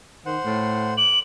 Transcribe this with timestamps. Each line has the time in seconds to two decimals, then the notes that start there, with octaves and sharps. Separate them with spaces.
0.26 D#3 C5 F#5
0.45 A2
0.97 D6 F#7